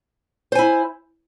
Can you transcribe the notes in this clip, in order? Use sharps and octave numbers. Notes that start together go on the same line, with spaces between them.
E4 C5 G#5